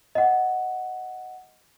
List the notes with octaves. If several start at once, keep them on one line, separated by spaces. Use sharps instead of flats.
D#5 F#5